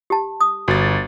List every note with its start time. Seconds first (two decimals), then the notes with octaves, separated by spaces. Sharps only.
0.10 G4 A5
0.41 D#6
0.68 G1 F#4 A6